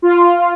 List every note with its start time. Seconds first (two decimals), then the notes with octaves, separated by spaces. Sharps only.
0.02 F4